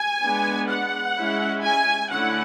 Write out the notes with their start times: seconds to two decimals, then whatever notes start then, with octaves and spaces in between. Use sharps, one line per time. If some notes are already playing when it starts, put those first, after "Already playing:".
Already playing: G#5
0.23 G#3 B3 D4
0.69 F#5
1.16 G#3 C#4 E4
1.64 G#5
2.11 D3 A3 C#4 E4 F#5